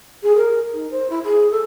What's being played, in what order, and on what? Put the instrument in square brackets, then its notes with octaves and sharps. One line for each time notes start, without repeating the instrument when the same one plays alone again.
[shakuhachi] G#4
A#4
D#4
C5
E4
G#4
A4